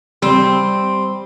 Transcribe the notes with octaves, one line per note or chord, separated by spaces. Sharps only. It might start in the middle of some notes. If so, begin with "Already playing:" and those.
G3 C4